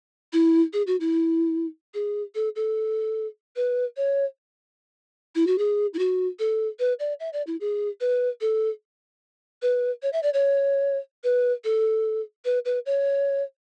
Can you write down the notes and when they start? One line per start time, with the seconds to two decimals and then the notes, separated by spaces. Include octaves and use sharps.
0.33 E4
0.73 G#4
0.87 F#4
1.00 E4
1.94 G#4
2.35 A4
2.56 A4
3.56 B4
3.97 C#5
5.35 E4
5.47 F#4
5.58 G#4
5.94 E4
5.99 F#4
6.39 A4
6.79 B4
6.99 D5
7.20 E5
7.33 D5
7.47 E4
7.61 G#4
8.01 B4
8.41 A4
9.62 B4
10.03 C#5
10.13 E5
10.23 D5
10.33 C#5
11.24 B4
11.64 A4
12.45 B4
12.65 B4
12.86 C#5